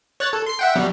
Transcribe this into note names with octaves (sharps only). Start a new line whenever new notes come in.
C#5 F#6 A6
A4
C6 C7
E5 F#5 G5
B2 F#3 G3